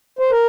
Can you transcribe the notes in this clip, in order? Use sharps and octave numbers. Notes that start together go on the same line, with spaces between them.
C5
A#4